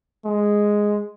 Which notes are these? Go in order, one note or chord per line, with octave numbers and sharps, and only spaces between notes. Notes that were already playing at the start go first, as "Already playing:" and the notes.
G#3